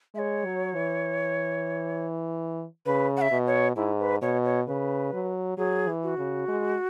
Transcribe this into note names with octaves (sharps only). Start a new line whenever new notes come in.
G#3 C#5 E5
F#3
E3
C#3 B4
F#5
E5
B2
C#5
G#2 E4
B4
B2 C#5
C#5
C#3 B4
F#3
F#3 G#4
E3
F#4
C#3
G#3